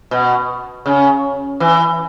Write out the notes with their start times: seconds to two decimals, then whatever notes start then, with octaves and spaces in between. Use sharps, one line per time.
0.11 B2
0.86 C#3
1.60 E3